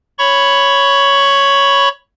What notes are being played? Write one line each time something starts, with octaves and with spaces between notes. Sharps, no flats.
C#5 B5 C#6